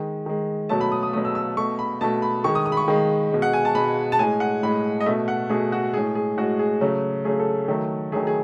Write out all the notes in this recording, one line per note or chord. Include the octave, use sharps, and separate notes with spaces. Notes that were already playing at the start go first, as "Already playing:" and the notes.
Already playing: D#3 G#3
D#3 G#3
B2 F#3 A3 A5
B5
D#6
D#6
B2 F#3 A3 D#6
E6
E6
B2 A3 C#6
B5
B2 A3 A5
B5
D#3 G#3 C#6
D#6
D#6
B5
C#6
D#3 G#3
B2 G#3
F#5
G#5
A5
B2 G#3 B5
A5
A2 G#3 G#5
F#5
A2 G#3 B5
D#5
B2 A3 E5
F#5
B2 A3 G#4
F#4
A2 G#3 G#4
G#4
A2 G#3 F#4
G#4
C#3 F#3 A3
C#3 F#3 A3 G#4
A4
D#3 F#3 A3
D#3 F#3 A3 G#4
G#4